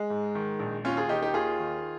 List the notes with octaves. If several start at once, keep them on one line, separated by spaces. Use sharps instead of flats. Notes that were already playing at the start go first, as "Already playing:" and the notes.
Already playing: G#3
G#2
D#3
A#1
D#2 C#4 F4
F4 G#4
D#3 D#4 G4
D#4 G4
D#2 F4 G#4
D#3